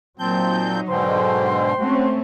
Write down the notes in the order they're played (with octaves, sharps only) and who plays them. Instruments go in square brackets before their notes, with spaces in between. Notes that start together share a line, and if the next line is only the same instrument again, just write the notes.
[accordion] A#2 C4 G6 [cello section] F#3 D#4 [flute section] A5
[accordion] G#2 B2 D3 [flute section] C5 G5 C6
[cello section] A3 C4 C#4 [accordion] F#4